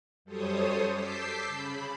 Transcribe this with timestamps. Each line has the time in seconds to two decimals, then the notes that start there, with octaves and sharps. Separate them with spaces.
0.24 F#2 G3 A4 C5 C#5 D#6
0.92 A5 D6 E6 G6 B6 C7
1.47 C#3 B5